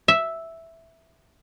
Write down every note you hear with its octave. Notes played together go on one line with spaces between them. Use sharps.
E5